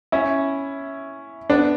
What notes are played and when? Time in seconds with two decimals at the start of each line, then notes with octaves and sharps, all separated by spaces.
0.12 C#4 E4
1.50 B3 D4